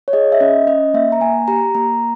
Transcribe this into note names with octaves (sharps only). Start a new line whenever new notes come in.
C#5
G#4 D#5
E5
C#4 D#5
C#4 D#5
A#3 E5
A#5
A#3 G#5
G4 A#5
A#3 A#5